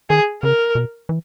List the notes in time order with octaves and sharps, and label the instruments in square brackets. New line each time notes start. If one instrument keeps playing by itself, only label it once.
[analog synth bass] D#3 [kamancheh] G#4
[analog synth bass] C#3 [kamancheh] A#4
[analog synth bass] B2
E3